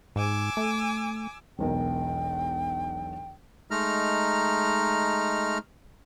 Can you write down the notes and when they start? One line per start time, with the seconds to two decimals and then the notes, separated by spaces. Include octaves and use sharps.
0.16 G#2 G#5 D6 E6
0.57 A3
1.59 E1 B1 A#4 G5
3.71 G#3 A3 D#4 A#5 F6